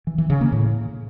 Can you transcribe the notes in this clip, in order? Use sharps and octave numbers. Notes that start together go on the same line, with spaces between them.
E3
E3
C#3
A#3
A2